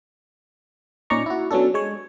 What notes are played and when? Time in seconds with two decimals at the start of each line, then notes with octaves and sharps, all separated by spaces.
1.10 A#2 C#4 D#4 D5 A#5 C#6
1.26 E4 F#4
1.51 F#3 B3 C#4 D4 A4
1.74 G#3 C#5